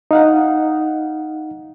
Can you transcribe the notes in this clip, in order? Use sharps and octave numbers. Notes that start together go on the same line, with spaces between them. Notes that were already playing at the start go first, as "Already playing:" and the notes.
D#4 F5 F#5